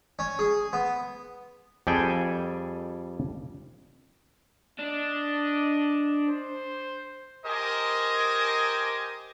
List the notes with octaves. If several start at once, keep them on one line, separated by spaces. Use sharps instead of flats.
C#4
G#4
B3
F2 G3 G#4 A4 G5 G#5
D4 D#5
C5
G4 A#4 C5 D#5 G#5